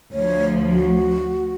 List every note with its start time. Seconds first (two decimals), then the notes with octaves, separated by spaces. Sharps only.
0.12 D2 F3 C#5
0.69 F#4